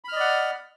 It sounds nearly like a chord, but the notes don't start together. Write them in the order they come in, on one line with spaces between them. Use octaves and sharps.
B5 F6 D#5 D5 F#5